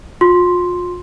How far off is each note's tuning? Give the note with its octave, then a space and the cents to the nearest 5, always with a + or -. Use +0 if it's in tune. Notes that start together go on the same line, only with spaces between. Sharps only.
F4 +35 C6 +0